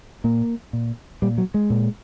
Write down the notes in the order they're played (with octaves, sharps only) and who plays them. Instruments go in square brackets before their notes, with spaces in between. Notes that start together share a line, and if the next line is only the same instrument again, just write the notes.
[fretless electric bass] A#2 A#3
A#2
A#2 G3
F#3
G#3
A#2